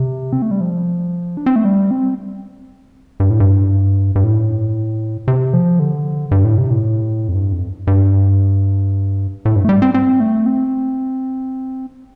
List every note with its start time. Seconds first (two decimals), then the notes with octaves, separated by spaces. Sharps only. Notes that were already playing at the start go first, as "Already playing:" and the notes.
Already playing: C3
0.33 C4
0.42 A3
0.51 G3
0.61 F3
1.37 D4
1.46 C4
1.56 A3
1.65 G3
1.91 C4
3.20 G2
3.30 A2
3.40 G2
4.16 G2
4.24 A2
5.28 C3
5.54 F3
5.79 D3
6.31 G2
6.45 A2
6.57 C3
6.70 A2
7.28 F2
7.35 G2
7.53 F2
7.87 G2
9.45 A2
9.56 G2
9.65 A3
9.69 G3
9.82 C4
9.94 C4
10.20 A3
10.46 C4